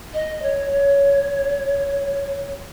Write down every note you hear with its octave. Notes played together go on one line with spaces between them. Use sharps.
D#5
C#5
C#5